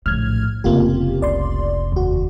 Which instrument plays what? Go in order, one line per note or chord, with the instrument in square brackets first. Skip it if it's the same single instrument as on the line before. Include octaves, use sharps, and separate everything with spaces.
[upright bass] A#1 A2 [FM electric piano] F6 G#6
[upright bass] F1 C#3 [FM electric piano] A#3 F4 G4
[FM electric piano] C2 D5 C6
D#2 F#4